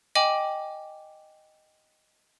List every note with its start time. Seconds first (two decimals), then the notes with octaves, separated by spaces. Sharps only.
0.15 D#5 G5 G#5 D6 F#7